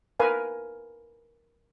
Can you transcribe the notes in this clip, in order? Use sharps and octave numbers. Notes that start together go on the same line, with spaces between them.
A#4 B4 F5 G#5